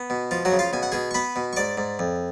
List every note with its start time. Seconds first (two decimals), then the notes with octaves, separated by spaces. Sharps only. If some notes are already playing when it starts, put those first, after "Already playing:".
Already playing: B3
0.10 B2
0.31 F3 F4
0.45 F#3 F#4
0.52 C#3
0.59 F4 F5
0.73 B2 G#5
0.83 F#5
0.92 B2 G#4 G#5
1.11 C#6
1.14 B3 B4 B5
1.36 B2
1.53 C#6
1.56 G#2 D5 D6
1.78 G#2
1.99 F2